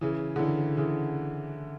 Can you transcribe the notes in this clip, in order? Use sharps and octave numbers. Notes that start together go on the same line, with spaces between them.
C#3 E3
D3
C#3 E3
C#3 E3